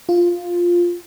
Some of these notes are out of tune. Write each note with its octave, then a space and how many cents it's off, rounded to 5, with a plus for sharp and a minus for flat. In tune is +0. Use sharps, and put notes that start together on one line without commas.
F4 +0